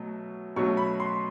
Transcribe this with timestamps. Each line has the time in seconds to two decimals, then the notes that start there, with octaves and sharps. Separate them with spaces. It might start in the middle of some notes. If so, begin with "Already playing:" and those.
Already playing: B2 F#3 A3
0.56 B2 F#3 A3 C#4 C#6
0.77 B5
1.00 C6